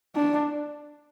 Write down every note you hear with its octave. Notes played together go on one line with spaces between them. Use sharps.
D4